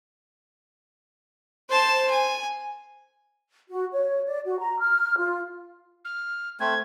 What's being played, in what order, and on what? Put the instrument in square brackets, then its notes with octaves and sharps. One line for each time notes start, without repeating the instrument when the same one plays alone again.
[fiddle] C5 A5
G#5
[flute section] F#4
C#5
D5
F#4
A#5
F6
F4
[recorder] F6
[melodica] A3 C4 [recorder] G#6